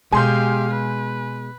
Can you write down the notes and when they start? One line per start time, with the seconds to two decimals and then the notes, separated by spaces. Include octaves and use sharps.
0.12 B2 G#3 G4 F5 G#5 C6 G6
0.71 B4